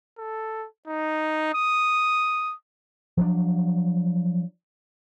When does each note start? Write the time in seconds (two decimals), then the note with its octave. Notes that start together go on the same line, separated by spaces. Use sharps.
0.18 A4
0.88 D#4
1.54 D#6
3.17 F3 F#3 D4